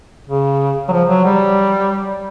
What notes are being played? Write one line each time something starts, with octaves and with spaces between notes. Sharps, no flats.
C#3
F#3
F3
F#3
G3